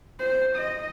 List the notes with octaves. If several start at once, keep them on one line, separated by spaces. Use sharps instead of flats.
C5
D#5